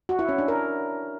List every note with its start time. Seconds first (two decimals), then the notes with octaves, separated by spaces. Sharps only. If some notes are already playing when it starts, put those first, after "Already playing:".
0.09 F#4
0.19 E4
0.29 C#4
0.38 D4
0.48 A#4